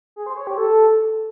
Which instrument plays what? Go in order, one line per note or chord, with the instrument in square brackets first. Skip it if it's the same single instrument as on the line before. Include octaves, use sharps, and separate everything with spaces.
[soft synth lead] G#4
C5
C#5
G4
A4